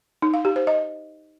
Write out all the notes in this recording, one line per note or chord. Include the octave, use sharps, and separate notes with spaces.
D#4
F5
G4
C5
D#5